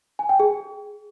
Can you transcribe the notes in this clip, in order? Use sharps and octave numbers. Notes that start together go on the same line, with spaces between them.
G#5
G5
G#4